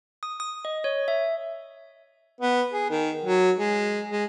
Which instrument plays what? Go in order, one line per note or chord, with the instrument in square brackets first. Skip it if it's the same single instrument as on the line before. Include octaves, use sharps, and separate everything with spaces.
[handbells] D#6
D#6
D#5
C#5
E5
[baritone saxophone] B3
G#4
D#3
F#3
G#3
G#3